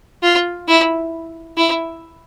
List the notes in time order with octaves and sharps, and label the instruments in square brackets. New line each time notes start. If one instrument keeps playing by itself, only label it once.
[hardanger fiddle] F4
E4
E4